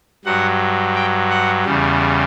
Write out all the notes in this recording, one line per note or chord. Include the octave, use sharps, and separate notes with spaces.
G2 F#3 F#5
G5
F#5
E2 C#3 G3